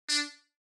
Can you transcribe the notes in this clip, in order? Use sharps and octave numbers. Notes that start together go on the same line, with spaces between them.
D4